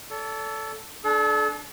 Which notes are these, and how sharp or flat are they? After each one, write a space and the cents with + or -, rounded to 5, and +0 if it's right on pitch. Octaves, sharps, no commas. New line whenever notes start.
A4 +0 D5 -45
D4 +0 A4 -40